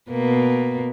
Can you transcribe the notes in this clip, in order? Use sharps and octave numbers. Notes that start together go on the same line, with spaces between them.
B2 A#3 B4